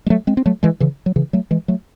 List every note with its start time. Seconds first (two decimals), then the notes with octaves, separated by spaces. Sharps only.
0.06 G#3
0.10 F#3 A3
0.27 G#3 C4
0.37 C4
0.46 F#3 A3
0.63 E3 G#3
0.80 C#3 E3
1.06 F#3
1.16 C#3 E3
1.33 F#3 A3
1.51 E3 G#3
1.68 F#3 A3